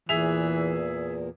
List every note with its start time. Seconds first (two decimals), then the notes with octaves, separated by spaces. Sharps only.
0.09 E2 A#2 E3 G#4 E5 F7